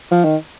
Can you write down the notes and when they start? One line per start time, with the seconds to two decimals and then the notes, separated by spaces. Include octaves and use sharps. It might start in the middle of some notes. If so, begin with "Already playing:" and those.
0.11 F3
0.24 D#3